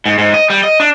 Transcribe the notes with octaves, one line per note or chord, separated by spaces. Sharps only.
G#2
G#2
D#5
G3
D#5
D4